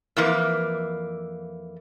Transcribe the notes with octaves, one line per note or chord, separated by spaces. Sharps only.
F2 E3 A#3